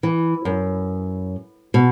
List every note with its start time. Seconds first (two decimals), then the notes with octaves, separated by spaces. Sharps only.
0.03 E3
0.45 F#2
1.74 B2